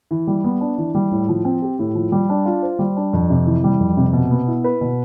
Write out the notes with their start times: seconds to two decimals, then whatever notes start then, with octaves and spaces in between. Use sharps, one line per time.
0.11 E3
0.27 G3
0.44 B3
0.61 D4
0.78 E3
0.95 G3
1.12 A2
1.29 F3
1.45 C4
1.62 G4
1.79 A2
1.95 F3
2.12 G3
2.29 D4
2.46 F4
2.63 C5
2.79 G3
2.97 D4
3.13 F2
3.30 C3
3.47 E3
3.64 G3
3.80 F2
3.97 C3
4.13 B2
4.31 B3
4.47 E4
4.64 B4
4.81 B2